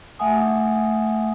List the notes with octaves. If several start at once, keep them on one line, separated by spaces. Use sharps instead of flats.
A3 E5 F#5 G#5 D#6